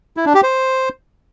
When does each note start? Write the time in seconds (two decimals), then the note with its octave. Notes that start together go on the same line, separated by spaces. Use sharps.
0.17 E4
0.26 D4
0.34 G4
0.43 C5